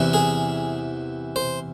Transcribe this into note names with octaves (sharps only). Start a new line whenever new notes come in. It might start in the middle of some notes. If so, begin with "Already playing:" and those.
Already playing: E2 C3 E3
G#4
C5